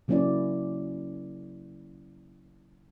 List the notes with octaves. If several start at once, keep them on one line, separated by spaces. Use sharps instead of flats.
C#3 F#3 A#3 C#4 E4 D5